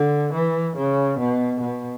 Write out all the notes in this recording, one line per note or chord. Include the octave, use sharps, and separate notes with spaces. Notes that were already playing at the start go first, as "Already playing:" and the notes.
Already playing: D3
E3
C#3
B2
B2